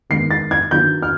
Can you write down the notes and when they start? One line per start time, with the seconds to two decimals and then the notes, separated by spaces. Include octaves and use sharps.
0.10 D#3 G#3 B3 C7
0.31 A6
0.51 G#6
0.71 D#3 F#3 B3 D4 G6
1.02 F6